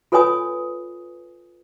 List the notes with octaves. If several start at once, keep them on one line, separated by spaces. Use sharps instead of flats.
F4 A4 B4 C#5 G#5 D#6